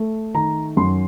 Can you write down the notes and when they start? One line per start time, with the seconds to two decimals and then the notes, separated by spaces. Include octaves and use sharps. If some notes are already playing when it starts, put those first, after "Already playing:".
Already playing: A3
0.34 D#3 A#5
0.77 F#2 C6